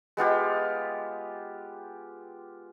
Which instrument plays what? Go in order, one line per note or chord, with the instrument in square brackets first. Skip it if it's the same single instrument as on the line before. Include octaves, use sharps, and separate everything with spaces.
[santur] G#3 B3 F4 G4